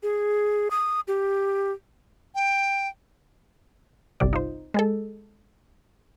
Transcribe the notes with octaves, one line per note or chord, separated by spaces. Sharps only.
G#4
D#6
G4
G5
G1 C2 C3 G3 D5
D#4 F4 C5
G#3 G#4 A4